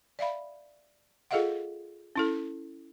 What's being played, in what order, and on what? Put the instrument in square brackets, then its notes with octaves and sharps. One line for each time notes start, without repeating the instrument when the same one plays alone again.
[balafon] D5 E5 F5 B5
F4 G#4 A4 D#5 F5 F#5
C#4 E4 A4